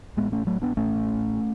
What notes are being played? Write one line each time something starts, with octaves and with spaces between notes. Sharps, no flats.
A1 A2 G#3 B3
A3 C#4
F#3 A3
B3 D4
A1 A2 A3 C#4